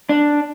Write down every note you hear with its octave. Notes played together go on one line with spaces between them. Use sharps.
D4